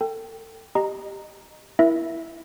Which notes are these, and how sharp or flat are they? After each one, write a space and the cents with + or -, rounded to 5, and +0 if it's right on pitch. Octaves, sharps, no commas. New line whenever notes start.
A4 +30 G5 +0
G4 +0 D#5 -20 A#5 +0
E4 +0 A#4 +35 E5 +0